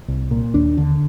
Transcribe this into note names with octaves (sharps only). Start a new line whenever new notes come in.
C2
A#2
D#2 D4
D3